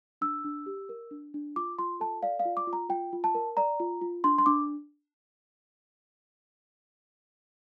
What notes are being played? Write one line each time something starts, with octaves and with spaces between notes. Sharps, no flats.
D4 E6
D4
G4
A#4
D4
D4
F4 D6
F4 C6
A4 A5
D5 F5
F5
F4
D6
F4
A#5
F4 G5
F4
A5
A#4
D5 A#5
F4
F4
D4 C6
C6
D4 D6